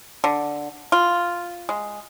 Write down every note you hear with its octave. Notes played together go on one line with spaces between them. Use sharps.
D3
F4
G#3